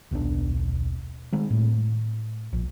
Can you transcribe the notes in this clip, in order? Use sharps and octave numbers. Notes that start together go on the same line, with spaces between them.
D#1 B1 B3 D4
D#3 G#3 C4
A2
A#1